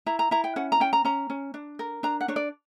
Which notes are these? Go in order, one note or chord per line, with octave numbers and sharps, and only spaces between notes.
E4 A#5
A#5
E4 A#5
G5
C#4 F#5
A#5
C#4 G5
A#5
C#4 A#5
C#4
D4
A#4
D4 A#5
F#5
D4 C#5
D5